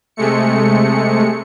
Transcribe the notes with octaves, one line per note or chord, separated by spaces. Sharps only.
C3 G#3 A3 C#7